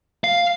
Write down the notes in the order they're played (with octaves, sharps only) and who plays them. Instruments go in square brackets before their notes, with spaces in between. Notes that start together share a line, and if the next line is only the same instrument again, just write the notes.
[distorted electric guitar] F5